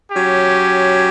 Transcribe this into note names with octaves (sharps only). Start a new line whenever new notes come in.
F#3 C#4 G4